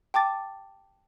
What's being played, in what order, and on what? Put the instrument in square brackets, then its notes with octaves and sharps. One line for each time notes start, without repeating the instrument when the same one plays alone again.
[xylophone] G5 A5 D6 A6